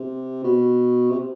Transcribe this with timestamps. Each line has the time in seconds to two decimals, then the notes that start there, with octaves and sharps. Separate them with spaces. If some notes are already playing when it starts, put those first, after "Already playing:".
Already playing: C3
0.44 B2
1.11 C3